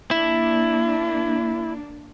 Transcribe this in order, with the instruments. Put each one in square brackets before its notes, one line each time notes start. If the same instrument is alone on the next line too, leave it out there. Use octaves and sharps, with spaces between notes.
[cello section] A#3 D4 [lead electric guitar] E4